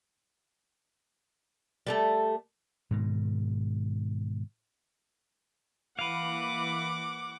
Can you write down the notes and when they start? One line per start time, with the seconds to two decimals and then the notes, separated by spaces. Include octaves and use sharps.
1.87 G3 A3 A4
2.91 G#2 B2 D#3
5.99 E3 A#3 B4 F5 F#5 D6